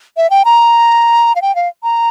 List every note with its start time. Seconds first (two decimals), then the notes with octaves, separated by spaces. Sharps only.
0.17 E5
0.30 G5
0.45 A#5
1.36 F5
1.42 G5
1.56 F5
1.83 A#5